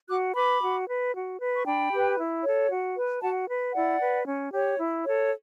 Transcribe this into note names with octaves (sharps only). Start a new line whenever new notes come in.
F#4 D6 F#6
B4 B5 D6
F#4
B4
F#4
B4
C#6
D4 G5 B5
G4 B4
E4
A4 C#5
F#4
B4
F#4 F#5 A5
B4
E4 D5 F#5
B4
C#4
G4 C#5
E4
A4 C#5